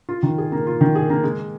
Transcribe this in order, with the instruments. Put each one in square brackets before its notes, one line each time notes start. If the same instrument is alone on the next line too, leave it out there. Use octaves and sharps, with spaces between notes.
[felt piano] F4
D#3
G#4
A#3
F4
D#3
G#4
A#3
G#3